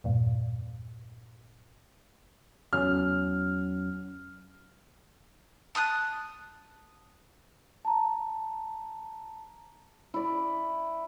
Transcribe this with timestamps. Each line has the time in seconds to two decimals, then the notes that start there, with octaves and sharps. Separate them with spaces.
0.04 E2 G2 A#2
2.73 E2 F#3 C#4 F6
5.75 A5 D#6 F6 F#6
7.85 A5 A#5
10.14 E4 D5